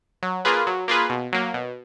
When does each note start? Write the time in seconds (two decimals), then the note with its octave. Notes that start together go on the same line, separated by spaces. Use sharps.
0.23 F#3
0.45 A#3 F4 G#4 B4
0.67 F#3
0.88 A#3 F4 G#4 B4
1.10 B2
1.32 F#3 A#3
1.54 B2